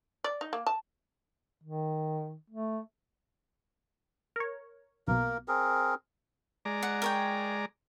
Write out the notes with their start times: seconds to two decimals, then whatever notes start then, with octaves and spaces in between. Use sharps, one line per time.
0.24 D5
0.41 D#4
0.53 A#3
0.66 A5
1.63 D#3
2.50 A3
4.36 A#4 C#5
5.08 B1 B2 A#3 A#4
5.48 C4 G#4 A#4
6.65 G#3 D5 A#5
6.83 F#5
7.02 A#4 C#5 G5